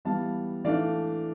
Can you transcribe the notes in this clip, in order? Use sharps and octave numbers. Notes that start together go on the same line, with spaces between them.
E3 G3 B3 F5 A5
E3 A3 D4 D5 F5